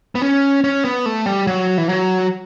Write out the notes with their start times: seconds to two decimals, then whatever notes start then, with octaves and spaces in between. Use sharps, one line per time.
0.15 B3
0.22 C#4
0.64 C#4
0.85 B3
1.06 A3
1.26 G3
1.47 F#3
1.78 E3
1.89 F#3